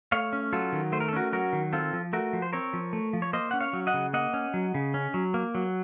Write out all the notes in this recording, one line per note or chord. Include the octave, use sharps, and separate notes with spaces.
A3 C#5 F5
C#4
F#3 F4 A4
D#3
A3 C5
A#4
A4
C#4 F#4 A#4
F#3 F#4 A#4
D#3
C4 F4 A4
F3
A3 F#4 A#4
F3
C5
C4 A#4 C#5
F3
A3
F3
C#5
A#3 C5 D#5
C#4 F#5
C#5 F5
F#3
D#5 F#5
C#3
A#3 D#5 F#5
C#4
F#3
C#3
C#4
F#3
A#3
F#3